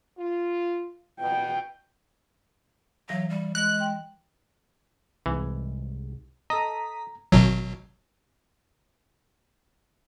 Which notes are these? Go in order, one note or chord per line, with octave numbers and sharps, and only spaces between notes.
F4
B2 G5
E3 F#3 F5 A#6
G3
G#3 F#6
G5
C2 G#2 E3
A4 D#5 A#5 D#6 B6
G#1 B2 F#3